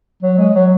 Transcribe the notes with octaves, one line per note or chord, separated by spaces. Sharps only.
F#3
G#3
F#3